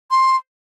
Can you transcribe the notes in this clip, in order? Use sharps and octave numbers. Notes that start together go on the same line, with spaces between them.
C6